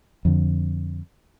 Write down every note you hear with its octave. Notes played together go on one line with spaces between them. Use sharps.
F2 D3